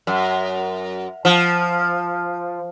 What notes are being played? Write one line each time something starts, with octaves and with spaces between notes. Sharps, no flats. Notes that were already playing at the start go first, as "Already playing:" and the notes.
F#2
F3